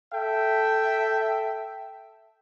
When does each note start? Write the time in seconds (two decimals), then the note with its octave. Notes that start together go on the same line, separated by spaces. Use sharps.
0.13 A4 E5 G5